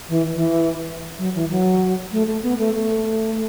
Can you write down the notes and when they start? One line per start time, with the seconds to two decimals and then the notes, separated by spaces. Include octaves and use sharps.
0.09 E3
0.35 E3
1.18 F#3
1.34 E3
1.50 F#3
2.12 A3
2.28 A3
2.43 B3
2.59 A3
2.75 A3